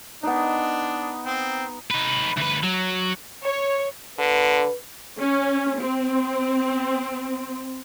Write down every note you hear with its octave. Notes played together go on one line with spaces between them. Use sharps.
B3 D4 D#4
C4
D#4 B4
D2 B4
F#3
C#5
D3 B4
C#4
C4